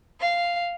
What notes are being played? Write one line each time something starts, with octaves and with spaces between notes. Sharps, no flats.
F5